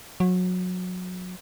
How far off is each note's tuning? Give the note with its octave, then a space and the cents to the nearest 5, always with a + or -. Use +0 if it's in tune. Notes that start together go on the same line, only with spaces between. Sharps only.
F#3 -25